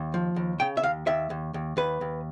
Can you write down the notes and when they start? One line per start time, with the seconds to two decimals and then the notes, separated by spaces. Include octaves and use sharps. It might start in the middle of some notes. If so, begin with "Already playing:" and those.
Already playing: D#2
0.14 F3
0.36 D#2
0.60 C#3 G5
0.77 E5
0.83 D#2 F5
1.07 D#2 E5
1.30 D#2
1.54 D#2
1.77 D#2 B4
2.01 D#2